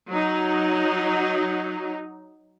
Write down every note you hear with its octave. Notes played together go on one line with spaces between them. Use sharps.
F#3 D#4